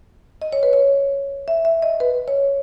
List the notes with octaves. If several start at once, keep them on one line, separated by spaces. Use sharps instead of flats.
D#5
C#5
B4
C#5
E5
E5
D#5
B4
C#5